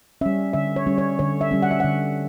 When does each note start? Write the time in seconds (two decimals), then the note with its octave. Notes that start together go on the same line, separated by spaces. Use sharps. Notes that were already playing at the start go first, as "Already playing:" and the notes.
0.21 G3 C#4 E5
0.53 D3 E5
0.76 C#5
0.87 G3 C#4
0.98 C#5
1.19 D3 C#5
1.41 E5
1.51 G3 C#4
1.62 F#5
1.71 E5
1.80 D3 F#5